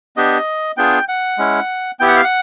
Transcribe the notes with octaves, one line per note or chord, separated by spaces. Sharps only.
B3 D4 G4 D#5
B3 D4 F4 G#4 G5
F#5
G#3 C#4 E4
B3 E4 G4 G5
F#5
F5
F#5